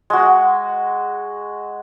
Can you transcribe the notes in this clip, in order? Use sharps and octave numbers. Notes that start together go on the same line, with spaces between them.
G#3 F#4